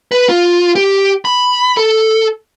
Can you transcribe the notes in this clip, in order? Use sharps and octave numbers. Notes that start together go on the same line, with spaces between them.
B4
F4
G4
B5
A4